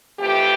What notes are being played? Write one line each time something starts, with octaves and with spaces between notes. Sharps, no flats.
F2 E3 A3 G4